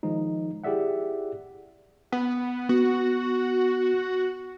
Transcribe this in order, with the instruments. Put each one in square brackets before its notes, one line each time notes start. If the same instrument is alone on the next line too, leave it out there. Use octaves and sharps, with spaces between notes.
[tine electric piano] D#3 F3 G#3 D#4
E4 G4 G#4 D5 E5 F#5
[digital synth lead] B3
[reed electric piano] B3 [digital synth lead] F#4